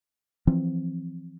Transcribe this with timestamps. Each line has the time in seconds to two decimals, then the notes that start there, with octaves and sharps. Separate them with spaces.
0.47 E3 F3 C4